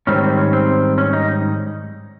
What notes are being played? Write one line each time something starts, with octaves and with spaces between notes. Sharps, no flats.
G#2 D#3 G3 C4 C#4
C4
C#4
C4
C#4
D#4